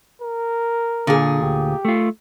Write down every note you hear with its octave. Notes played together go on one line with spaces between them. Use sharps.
A#4
A#2 D3 G#4
D2 G4
A3 F4